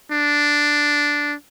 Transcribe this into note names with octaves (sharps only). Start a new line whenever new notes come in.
D4